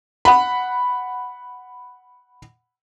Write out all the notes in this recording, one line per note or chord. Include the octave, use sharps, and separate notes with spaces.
F#5 B5